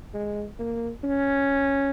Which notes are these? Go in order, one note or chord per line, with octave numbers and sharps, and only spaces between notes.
G#3
A#3
C#4